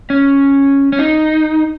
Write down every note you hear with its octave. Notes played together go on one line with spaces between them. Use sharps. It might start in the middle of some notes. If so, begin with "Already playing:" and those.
C#4
C#4
D#4